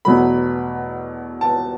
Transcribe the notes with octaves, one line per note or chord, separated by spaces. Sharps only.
E2 B2 F#3 A3 B5
A5